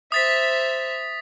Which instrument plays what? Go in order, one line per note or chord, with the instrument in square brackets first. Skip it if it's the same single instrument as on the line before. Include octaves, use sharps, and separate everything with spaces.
[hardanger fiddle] C5 E5 [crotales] D#6 A6 B6